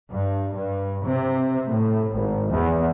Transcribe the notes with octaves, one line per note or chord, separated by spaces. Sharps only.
G2
G2
C3
A2
G#1
E2